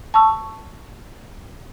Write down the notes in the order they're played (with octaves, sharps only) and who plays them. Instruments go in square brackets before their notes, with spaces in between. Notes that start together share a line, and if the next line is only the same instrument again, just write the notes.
[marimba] A5 C#6 E6